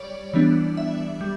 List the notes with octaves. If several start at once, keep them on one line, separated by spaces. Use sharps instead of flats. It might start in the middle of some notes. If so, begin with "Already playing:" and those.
Already playing: G3 C#5 D5
E3 G3 B3 D4
E5
G3